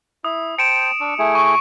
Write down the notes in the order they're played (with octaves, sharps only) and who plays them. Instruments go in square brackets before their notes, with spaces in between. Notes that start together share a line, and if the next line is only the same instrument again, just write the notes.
[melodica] E4 [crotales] D#6
[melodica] C5 G5 A5 [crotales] C#7 D7 E7
[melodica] D4 C#6 E6
A3 E4 G#4
[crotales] C#6